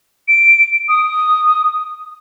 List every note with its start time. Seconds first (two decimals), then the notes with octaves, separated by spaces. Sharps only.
0.28 D7
0.89 D#6